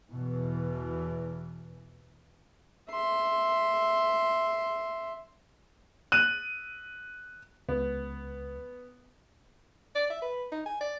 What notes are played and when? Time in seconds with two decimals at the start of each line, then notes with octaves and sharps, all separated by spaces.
0.10 E2 B2 E3
2.90 E5 C6
6.12 F#6 D#7
7.69 C#2 B3
9.95 D5
10.10 E5
10.22 B4
10.52 D#4
10.66 G#5
10.81 D5